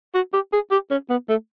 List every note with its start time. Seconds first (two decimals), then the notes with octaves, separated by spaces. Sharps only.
0.15 F#4
0.33 G4
0.53 G#4
0.71 G4
0.91 C#4
1.10 B3
1.29 A3